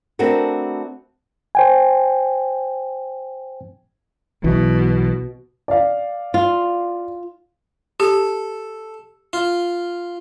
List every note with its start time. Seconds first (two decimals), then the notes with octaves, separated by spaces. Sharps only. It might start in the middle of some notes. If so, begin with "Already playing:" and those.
0.19 A3 B3 C4 D4 F#4 A#4
1.55 C5 G5 G#5
4.44 B1 B2 E3
5.68 D5 F5
6.34 F4
8.00 G4 A4
9.33 F4